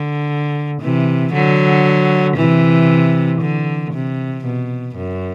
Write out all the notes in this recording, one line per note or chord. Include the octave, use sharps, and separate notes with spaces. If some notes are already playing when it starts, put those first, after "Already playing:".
Already playing: D3
C3 E3
D3 F#3
C3 E3
D3
C3
B2
F#2